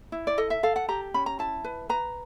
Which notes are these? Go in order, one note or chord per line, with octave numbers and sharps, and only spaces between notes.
E4
D5
A4 D#5
E5
A4 F5
F#5
G4 A#5
C#4 B5
A#5
E4 A5
B4
B4 A#5